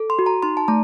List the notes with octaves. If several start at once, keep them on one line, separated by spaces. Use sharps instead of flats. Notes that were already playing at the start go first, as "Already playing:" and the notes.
Already playing: A4
C6
F#4
A#5
D#4 C6
A5
A3 A#5